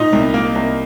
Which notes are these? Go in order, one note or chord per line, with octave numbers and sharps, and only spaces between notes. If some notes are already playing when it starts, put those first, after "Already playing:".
Already playing: A#2 D#4
C2
A#3
C2